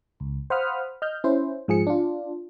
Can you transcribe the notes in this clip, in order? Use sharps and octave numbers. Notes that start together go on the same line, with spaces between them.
C#2
C5 F5 F#5 B5 D#6 F6
D#5 F6 G6
C#4 E4 C5
G#2 F3 G#4 C#7
D4 F4